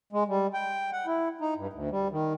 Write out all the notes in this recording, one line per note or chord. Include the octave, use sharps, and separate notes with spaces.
G#3
G3
G5
F#5
E4
D#4
G2
D2
G3
D#3